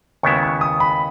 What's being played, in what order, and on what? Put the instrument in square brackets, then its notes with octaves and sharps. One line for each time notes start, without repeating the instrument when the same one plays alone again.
[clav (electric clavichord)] D#2 C#3 G#3 B3 E4 [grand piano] C#6
[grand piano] C#6
D#6
B5